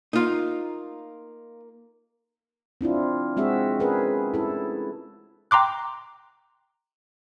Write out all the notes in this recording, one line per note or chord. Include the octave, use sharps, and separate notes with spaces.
A#3 D#4 F4
C4 D4 E4 F4
G#3 C4 F#4 G#4 E5
C#4 G#4 A#4 B4
E4 A4
G5 A#5 C6 D6 F#6